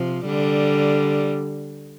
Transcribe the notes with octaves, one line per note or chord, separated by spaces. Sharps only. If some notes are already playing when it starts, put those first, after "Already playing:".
Already playing: C3 F3
D3 G3